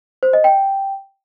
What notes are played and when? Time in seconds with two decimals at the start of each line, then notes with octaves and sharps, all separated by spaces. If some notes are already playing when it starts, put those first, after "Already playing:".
0.23 C5
0.33 D#5
0.44 G5